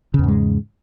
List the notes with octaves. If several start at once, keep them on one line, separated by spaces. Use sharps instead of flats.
E2 G#2 C#3 G#3